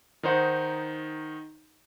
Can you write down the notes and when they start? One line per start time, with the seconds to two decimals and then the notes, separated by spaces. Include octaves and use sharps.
0.23 D#3 D#4 C5 F#5